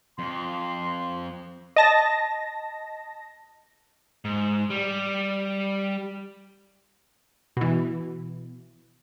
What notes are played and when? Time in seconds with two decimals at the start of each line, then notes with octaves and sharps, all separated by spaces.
0.19 F2 C6
1.76 D#5 A5 A#6
4.25 G#2
4.70 G3
7.57 B2 E3